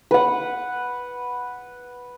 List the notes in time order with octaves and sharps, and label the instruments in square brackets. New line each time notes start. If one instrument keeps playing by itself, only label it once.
[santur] B4 F#5